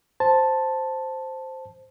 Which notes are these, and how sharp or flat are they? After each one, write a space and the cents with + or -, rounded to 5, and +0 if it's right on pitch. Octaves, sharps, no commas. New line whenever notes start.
C5 +0 A5 +0